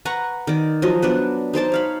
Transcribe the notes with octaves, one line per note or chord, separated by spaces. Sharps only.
B4 F#5 A#5 C#6
D#3 D5
F3 F#3 D#5
B3 D4 B4
D#4 C5 D5 A5
C#5 F5 B5